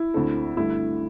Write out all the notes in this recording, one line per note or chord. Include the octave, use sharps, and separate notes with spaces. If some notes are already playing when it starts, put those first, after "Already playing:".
Already playing: E4
D2 D3 C4 A4
G2 D3 A3 E4